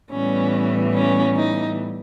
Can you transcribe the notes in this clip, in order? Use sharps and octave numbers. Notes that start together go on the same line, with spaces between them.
A2 E3 G3 B3 C#4
C#4
D#4